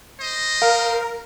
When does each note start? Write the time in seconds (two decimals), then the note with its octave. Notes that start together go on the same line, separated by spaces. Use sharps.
0.20 C5 D#5
0.62 A#4 F5